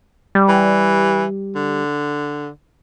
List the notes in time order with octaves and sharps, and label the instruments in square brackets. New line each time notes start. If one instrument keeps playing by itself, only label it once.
[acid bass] G3
[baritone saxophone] E3
D3